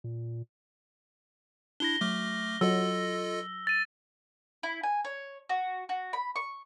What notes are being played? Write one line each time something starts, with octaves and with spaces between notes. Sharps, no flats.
A#2
D4 E4 A#6 G7
F#3 A3 D6 F6
F#3 F4 A4 D#5 E6
A6 D#7
E4
G#5
C#5
F#4
F#4
B5
C#6